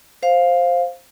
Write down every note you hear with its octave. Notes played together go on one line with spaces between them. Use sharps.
C5 F5